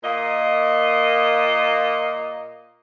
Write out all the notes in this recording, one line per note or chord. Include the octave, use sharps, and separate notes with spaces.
A#2 A#3 D#5